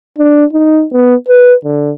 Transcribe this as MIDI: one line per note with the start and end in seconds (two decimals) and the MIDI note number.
0.18 0.45 62
0.53 0.85 63
0.92 1.15 59
1.28 1.54 71
1.65 1.92 50